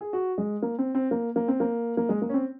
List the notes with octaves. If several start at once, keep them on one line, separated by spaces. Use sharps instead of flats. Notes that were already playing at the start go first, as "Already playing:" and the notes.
G#4
F#4
G#3
A#3
C4
C4
A#3
A#3
C4
A#3
A#3
G#3
A#3
C#4
C4